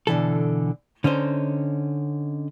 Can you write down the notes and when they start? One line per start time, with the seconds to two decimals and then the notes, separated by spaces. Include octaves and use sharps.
0.07 B2 D3 E3 A4
1.04 D3 C#4 D#4 C5